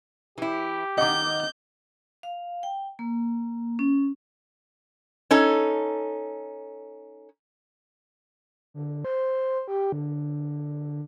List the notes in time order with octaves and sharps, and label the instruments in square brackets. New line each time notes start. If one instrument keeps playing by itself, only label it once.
[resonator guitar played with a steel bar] E3 E4 [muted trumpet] G4
[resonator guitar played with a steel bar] D#3 F#5 [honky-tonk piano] D#5 D6 [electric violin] G6
[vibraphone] F5
G5
A#3
C#4
[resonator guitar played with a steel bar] C#4 D#4 A4
[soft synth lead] D3
C5
G4
D3